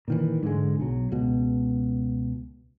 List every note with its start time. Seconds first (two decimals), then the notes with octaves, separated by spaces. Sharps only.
0.08 A#2 D#3 E3
0.43 G#2 D3 G#3
0.79 B1 F#3
1.12 C#2 B2